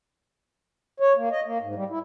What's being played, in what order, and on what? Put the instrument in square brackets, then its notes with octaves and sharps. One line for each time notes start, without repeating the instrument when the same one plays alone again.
[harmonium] C#5
A#3
D#5
A#3
G#2
G3
E4